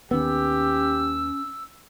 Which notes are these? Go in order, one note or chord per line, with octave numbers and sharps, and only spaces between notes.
D#2 D#3 B3 C#4 G4 E6